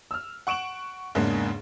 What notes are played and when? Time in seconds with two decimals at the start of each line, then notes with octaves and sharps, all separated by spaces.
0.11 E6 F6
0.47 F#5 C#6 D7 E7 F#7
1.15 E2 G#2 C#3 A#3 D4